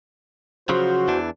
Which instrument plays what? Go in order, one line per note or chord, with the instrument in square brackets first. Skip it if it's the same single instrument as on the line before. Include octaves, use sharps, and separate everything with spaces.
[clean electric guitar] C#3 F3 F#3 [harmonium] F#4 C5
[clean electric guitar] E2 E3 D4